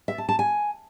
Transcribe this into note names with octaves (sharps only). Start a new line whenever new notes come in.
E5
A5
A5
G#5